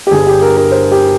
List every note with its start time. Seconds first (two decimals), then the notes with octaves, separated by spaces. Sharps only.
0.07 G4
0.11 G1 G2 G3 G#4
0.27 G4
0.42 A#4
0.57 A#4
0.71 C5
0.92 G4